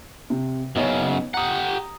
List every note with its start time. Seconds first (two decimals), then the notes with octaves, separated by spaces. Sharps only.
0.30 C3
0.76 F#2 C#3 B3 D#4 C#5
1.34 G4 F#5 A#5 D#6